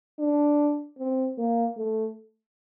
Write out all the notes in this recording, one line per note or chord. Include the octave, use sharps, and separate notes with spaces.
D4
C4
A#3
A3